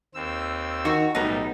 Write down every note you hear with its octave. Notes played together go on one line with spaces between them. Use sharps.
D#2 C4 E6
D#3 F#4
B1 A2 G3 B3 D#4